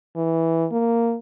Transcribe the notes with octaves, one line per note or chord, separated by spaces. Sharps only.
E3
A#3